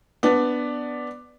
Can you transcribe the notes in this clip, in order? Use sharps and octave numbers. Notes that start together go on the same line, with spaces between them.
B3 D4